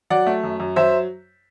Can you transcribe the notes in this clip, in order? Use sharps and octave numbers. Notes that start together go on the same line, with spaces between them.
F#3 D5 F#5
A3
F#2
F#2
F#3 C5 E5